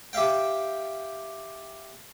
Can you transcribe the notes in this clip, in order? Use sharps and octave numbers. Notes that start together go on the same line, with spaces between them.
G4 E5 F5 G5